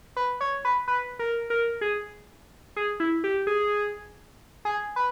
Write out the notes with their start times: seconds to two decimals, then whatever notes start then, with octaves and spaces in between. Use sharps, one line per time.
0.16 B4
0.41 C#5
0.65 B4
0.88 B4
1.19 A#4
1.50 A#4
1.81 G#4
2.76 G#4
3.00 E4
3.24 G4
3.47 G#4
4.65 G#4
4.96 B4